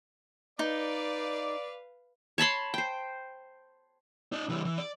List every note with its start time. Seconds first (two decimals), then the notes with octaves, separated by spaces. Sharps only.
0.59 D#4 B4 D5 F5
2.38 C#5 A5 B5 C6
2.74 C5 G5
4.32 D#4 D5
4.49 E3 G3
4.65 E3
4.78 D5